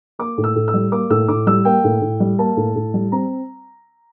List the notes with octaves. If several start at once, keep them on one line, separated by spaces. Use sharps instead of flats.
A#3 D6
A2
E6
A2
E6
G3
A#3 D6
A2 E6
A2 D6
G3 E6
A#3 G5
A2
A2
G3
A#3 A5
A2
A2
G3
C4 A#5